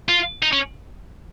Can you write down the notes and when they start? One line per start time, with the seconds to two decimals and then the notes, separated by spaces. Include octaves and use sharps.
0.09 F4
0.43 D#4
0.53 C#4